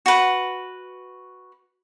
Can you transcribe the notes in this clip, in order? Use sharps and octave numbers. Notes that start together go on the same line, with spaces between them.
F#4 B4